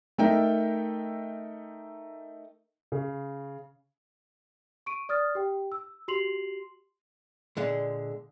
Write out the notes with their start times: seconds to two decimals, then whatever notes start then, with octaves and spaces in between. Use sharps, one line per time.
0.18 A3 D#4 A#4 E5 G5
2.92 C#3
4.86 C#6 D7 D#7
5.09 D5 D#6 F6 A6
5.35 G4 G5
5.72 E6
6.08 F#4 G4 C6 C7 F7 F#7
7.57 A#2 D3 G#3